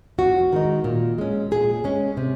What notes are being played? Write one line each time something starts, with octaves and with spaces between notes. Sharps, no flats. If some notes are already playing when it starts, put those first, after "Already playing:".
F2 F#4
D#3 G#3 D#4
A#2
G#3 C#4
A#2 G#4
G#3 C#4
C3